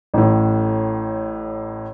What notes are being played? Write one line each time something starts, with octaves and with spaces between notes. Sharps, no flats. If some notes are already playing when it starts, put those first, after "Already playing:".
A1 A2